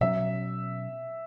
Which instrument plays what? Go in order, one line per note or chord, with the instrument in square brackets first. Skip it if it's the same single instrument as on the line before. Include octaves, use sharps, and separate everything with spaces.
[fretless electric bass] B2 F#3 C#4 [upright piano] E5